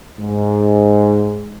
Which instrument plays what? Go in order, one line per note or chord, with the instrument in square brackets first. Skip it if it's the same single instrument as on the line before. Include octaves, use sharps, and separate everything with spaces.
[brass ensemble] G#2